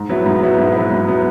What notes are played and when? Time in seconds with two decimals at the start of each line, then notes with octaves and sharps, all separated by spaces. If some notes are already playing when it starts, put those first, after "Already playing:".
Already playing: G#2
0.09 F#3 B3 E4
0.26 G#2
0.42 F#3 B3 E4
0.59 G#2
0.75 F#3 B3 E4
0.91 G#2
1.07 F#3 B3 E4